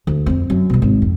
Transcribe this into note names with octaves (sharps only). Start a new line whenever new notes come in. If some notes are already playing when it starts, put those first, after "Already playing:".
D2
F2 C4
F#2
G2 B2
G#1
F2